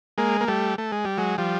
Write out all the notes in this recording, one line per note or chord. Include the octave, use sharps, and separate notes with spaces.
G#3 A#3
A#3
G3 A3
A3
G#3
G3
F#3 G#3
F3 G3